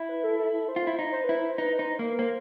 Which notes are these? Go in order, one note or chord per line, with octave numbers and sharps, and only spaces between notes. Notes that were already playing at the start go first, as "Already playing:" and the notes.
Already playing: E4
B4
A4
A4
C5
F4
E4
D#4
C5
E4 B4
C5
D#4 B4
D#4 C5
A#3 B4
A#3 C5